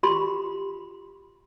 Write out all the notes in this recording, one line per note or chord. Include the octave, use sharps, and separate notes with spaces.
F4 G4 B5 C6